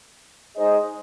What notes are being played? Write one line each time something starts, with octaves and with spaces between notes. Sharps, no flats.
G#3 D#4 G#4 C5 D#5